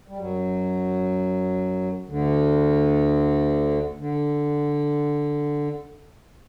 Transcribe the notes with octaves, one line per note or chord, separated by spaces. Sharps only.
G3
F#2 F#3
D2 D3
D3